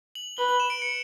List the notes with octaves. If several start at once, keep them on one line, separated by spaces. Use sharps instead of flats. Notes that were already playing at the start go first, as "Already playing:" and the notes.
F#7
B4 G7
F#7
E7
D7
C#7